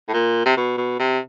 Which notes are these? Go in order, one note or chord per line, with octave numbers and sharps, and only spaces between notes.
A2
A#2
C3
B2
B2
C3